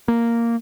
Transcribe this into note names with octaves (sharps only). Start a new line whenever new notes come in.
A#3